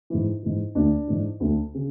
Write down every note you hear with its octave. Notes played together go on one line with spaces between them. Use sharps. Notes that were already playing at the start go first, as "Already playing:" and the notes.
G#2 E3
G#2 E3
D2 D3 D4
G#2 E3
D2 D3
C#3